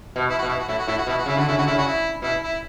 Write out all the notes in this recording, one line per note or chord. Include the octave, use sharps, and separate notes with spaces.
B2
E4
B2 F#4
E4
F#4
A2 E4
F#4
A2 E4
F#4
B2 E4
F#4
C#3 E4
D3 F#4
C#3 E4
D3 F#4
C#3 E4
F#4
E4
B2 E4
E4